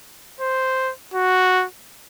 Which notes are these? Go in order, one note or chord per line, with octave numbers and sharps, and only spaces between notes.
C5
F#4